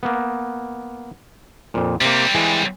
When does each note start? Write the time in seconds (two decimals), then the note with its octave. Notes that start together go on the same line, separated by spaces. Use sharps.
0.03 A#3 B3
1.74 F2 A#2
2.01 C3 G3 A#3 C4
2.34 E3 G#3 G#5